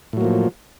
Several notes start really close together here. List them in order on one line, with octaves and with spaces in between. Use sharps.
A2 F#3 A#3 F3